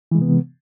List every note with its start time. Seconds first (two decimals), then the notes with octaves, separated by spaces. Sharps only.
0.11 E3
0.15 G#3
0.18 C3
0.22 B3